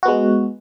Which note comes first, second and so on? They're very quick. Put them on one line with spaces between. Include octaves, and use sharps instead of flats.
F#4 B3 G#3